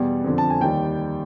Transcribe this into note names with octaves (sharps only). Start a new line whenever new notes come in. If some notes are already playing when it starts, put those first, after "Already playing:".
Already playing: E2 B2 G3
F2 D3 F3
A5
G#5
D#2 D#3 G3 G5